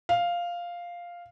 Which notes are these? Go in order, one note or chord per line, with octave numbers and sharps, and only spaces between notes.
F5